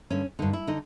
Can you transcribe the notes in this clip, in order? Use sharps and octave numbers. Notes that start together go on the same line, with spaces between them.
G2 D3 C#4
G2 D3 D#4
E4
D3 D#4